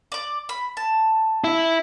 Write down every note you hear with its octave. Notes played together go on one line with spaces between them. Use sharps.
D5 D6
B5
A5
E4